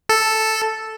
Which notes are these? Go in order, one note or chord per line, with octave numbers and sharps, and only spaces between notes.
A4